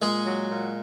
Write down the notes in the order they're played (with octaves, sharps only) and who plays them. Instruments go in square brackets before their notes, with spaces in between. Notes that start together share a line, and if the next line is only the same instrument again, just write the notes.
[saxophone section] A#2 [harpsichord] G#3 G#4
[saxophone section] F#3
A#2